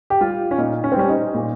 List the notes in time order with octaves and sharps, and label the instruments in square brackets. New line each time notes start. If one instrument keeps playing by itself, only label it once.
[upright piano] G4
G3 F4
C#4
A#2 D#4
C#4
C4
G3 C#4
D#4
A#2